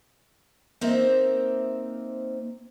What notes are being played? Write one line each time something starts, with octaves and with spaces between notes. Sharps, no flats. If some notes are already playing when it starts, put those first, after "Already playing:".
A#3 C4 D#4 C5 E5